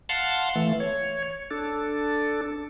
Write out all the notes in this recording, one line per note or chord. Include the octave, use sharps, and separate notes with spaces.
F5 F#5 A5 C6
E3 A3
C#5
D4 A4